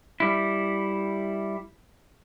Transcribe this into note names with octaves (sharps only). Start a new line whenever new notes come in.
G3 E4